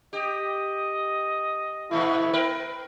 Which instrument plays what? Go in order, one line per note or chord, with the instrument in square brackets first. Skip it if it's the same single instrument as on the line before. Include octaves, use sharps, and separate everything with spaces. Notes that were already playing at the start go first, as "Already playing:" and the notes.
[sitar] G4 [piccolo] D#5
[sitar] A#2 E3 A3 [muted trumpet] E4
[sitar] B3 A#4 B4